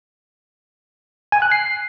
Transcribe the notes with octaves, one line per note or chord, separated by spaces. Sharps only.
G#5
F#6
C7